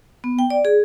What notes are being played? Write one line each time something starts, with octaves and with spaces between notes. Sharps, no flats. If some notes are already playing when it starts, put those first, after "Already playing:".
B3
G5
D5
G#4